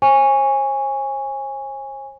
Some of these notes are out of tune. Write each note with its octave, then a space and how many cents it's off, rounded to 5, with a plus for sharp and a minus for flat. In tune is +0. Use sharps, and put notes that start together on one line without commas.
C5 +45 G#5 -15 C#6 +10